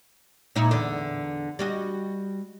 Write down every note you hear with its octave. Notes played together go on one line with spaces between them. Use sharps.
A#2 D#4 E4
E2 D3
G3 F#4 D#5